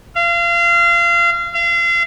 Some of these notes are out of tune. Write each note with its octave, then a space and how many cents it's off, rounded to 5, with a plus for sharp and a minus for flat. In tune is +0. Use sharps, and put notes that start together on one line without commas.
F5 -30
F5 -35